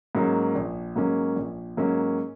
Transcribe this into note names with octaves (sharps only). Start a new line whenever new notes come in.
G#2 F#3 A#3 C#4
A#1
G#2 F#3 A#3 C#4
A#1
G#2 F#3 A#3 C#4